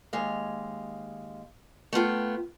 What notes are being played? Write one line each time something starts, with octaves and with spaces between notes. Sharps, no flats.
D#2 G#3 F5
A3 B3 F4 G5